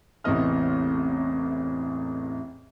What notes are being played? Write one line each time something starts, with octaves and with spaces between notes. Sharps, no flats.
A1 E2 C3 E3 D#5 F6